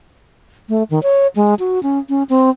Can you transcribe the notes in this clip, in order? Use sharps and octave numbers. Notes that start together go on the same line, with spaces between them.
A3
D#3
C#5
G#3
F#4
C#4
C#4
C4